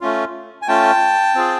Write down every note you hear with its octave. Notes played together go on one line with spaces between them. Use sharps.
A3 C#4 F4
G#5
A3 C#4 F4 G5 A5
C4 F4 G#4